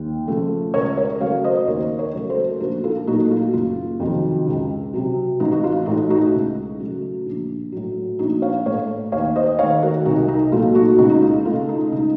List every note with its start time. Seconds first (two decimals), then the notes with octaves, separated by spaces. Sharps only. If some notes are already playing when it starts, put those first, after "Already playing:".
Already playing: D#2
0.28 C#3 F3 A3
0.74 C#2 A#4 C#5
0.97 A#4 C#5
1.20 C#3 F#3 A3 C#5 F5
1.44 C5 D#5
1.67 D#2 A#4 C#5
1.99 A#4 C#5
2.14 C#3 F#3 A3
2.30 A4 C5
2.60 A#1 F#4 A#4
2.84 F4 A4
3.07 A#2 F#3 A3 D#4 F#4
3.25 F#4
3.31 F4
3.53 F#1 F4
4.00 F2 C3 D#3 F#3
4.47 C#2
4.94 C3 F#3
5.40 A1 D#4
5.52 F#4
5.64 F4
5.86 A2 A3 D#4 F#4
6.10 D#4 F#4
6.34 C#2
6.79 C#3 F#3 A3
7.26 A#1
7.72 A2 F#3
8.19 A#1 D#4 F#4
8.42 C#5 F5
8.66 A2 A3 C#5 F5
9.12 D#2 C#5 F5
9.36 C5 D#5
9.59 D#3 A3 C#5 F5
9.82 F#4 A#4
10.05 C2 D#4 F#4
10.28 D#4
10.52 A#2 F#3 A3 F4
10.75 D#4 F#4
10.98 C#2 D#4 F#4
11.10 D#4
11.22 F4
11.45 C#3 A3 F4
11.69 D#4
11.91 C#2 D#4